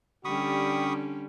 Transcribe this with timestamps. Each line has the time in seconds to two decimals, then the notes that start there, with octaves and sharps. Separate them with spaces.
0.25 D3 G3 C#4 G4 B5 C#6 D#6